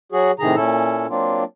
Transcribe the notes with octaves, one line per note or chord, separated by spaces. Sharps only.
F#3 F#4 G#4
A2 C3 D#3 G#4 A#5
A#2 C#4 E4 A4
F#3 A#3 C4 D4 F4